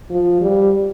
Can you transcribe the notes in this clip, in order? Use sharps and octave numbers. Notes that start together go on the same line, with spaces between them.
F3
G3